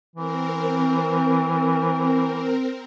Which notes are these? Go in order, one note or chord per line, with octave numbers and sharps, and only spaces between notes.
E3 C4 A#4